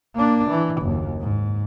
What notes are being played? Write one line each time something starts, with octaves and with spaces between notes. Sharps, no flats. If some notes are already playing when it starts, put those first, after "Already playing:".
A#3 D4
E3
F#1 D#2
G#2